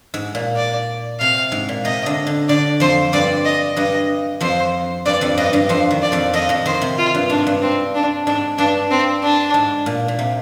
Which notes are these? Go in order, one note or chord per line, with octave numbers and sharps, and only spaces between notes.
G#2
A#2
D5
C3 F5
G#2
A#2
C3 D#5
D3
D3
D3 D5
F2 F3 C5
G2 G3 D5
D#5
G2 G3 D#5
F2 F3 C5
G2 G3 D5
F2 F3
G2 G3 D#5
G2 G3
F2 F3 C5
D#3
D5
F2 F3
F2 F3 D#5
F2 F3
D#3 C5
C3
F4
G2
G#2 D4
G2
C4
D4
G#2 D4
G2 D4
C4
D4
G#2
A#2
A#2
C3